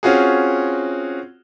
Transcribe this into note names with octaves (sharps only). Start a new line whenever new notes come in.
C4 C#4 F4 F#4 G#4